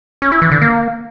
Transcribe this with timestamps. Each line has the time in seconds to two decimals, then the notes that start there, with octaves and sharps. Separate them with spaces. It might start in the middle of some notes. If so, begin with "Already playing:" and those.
0.22 C#4
0.32 E4
0.42 E3
0.52 D3
0.61 A#3